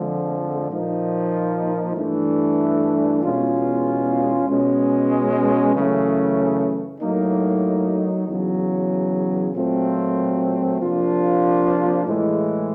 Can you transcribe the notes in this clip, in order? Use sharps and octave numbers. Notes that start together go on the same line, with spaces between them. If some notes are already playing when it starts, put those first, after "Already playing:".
Already playing: F2 D3 F3 G#3
A#2 F3 A#3 D#4
G2 E3 A3 D4
E2 B2 G#3 C#4 F4
B2 G#3 C#4
F#2 C#3 E3 A3 C#4
A2 F#3 A#3 D#4
E2 C#3 F#3
A#2 F#3 A3 C4 F4
C3 F3 A#3 D4 F4
A2 E3 G#3